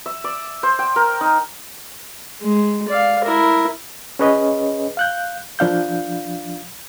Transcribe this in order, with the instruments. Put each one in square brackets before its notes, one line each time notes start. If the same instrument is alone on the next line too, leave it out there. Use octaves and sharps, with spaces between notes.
[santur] E5
D5
C5
G5
A#4
D#4
[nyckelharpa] G#3
D5 F5
E4 A#4
[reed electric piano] C#4 G#4 B4 C#5 D#5
F5 F#6 G6
F3 D4 F5 G6